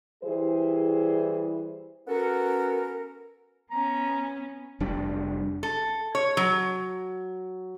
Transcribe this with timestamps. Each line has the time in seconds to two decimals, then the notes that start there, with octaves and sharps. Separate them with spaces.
0.23 E3 G3 E4 G#4 C5
2.08 B3 C#4 F#4 A4 A#4
3.71 B3 C#4 A#5
4.80 F1 G3 D4
5.63 A4
6.15 C#5
6.37 F#3